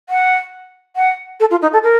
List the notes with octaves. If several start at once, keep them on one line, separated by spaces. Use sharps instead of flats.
F#5
F#5
A4
F4
D#4
A4
A#4